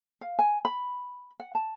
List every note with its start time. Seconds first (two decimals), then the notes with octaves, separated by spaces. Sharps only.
0.21 F5
0.39 G#5
0.65 B5
1.40 F#5
1.55 A5